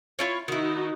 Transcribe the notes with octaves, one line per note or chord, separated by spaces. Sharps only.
E4 F4 C#5
D#3 D#4 E4 F#4